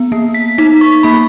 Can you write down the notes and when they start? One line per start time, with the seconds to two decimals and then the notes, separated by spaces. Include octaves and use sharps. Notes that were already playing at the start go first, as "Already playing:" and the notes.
Already playing: B3
0.12 A#3
0.34 B6
0.58 D#4 B6
0.81 C#6
1.03 A#3 B5